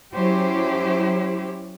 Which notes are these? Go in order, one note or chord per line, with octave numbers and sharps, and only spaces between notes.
F#3 C#4 E4 G4 C5